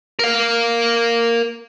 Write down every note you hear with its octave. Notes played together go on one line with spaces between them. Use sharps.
A#4 F5